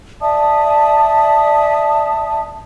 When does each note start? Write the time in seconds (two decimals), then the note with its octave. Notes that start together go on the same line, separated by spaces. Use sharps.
0.22 D5 E5 A5 D#6